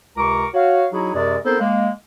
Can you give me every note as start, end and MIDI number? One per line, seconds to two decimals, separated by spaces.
0.17 0.47 37
0.17 0.47 48
0.17 0.47 70
0.17 0.47 82
0.17 0.47 85
0.17 0.47 86
0.54 0.86 66
0.54 0.86 73
0.54 0.86 77
0.93 1.12 54
0.93 1.12 63
0.93 1.12 64
0.93 1.12 66
0.93 1.12 68
1.14 1.37 42
1.14 1.37 48
1.14 1.37 56
1.14 1.37 68
1.14 1.37 70
1.14 1.37 74
1.45 1.57 59
1.45 1.57 60
1.45 1.57 63
1.45 1.57 69
1.45 1.57 70
1.45 1.57 72
1.60 1.90 56
1.60 1.90 58